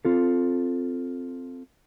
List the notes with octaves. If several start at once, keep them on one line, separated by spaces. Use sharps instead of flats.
C4 F4 A4